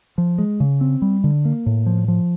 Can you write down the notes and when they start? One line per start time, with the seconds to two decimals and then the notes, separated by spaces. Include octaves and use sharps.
0.18 F3
0.38 G#3
0.60 C#3
0.81 C4
1.02 G3
1.24 D3
1.45 A#3
1.66 A2
1.86 F3
2.08 F3